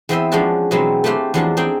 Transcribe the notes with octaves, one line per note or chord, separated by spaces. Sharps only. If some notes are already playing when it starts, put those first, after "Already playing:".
E2 C4 E4 C5 D#5 E5
F3 G#3 C#4 D4 F#4 A5
B2 E3 F#3 G#3 B3 C4
A3 E4 G4 C5 F5 F#5
E2 F3 F#3 D4 C5 A5
C4 D#4 G#4 G5